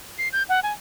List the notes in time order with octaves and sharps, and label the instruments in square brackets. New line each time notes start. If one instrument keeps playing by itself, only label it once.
[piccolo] C7
G6
F#5
G#5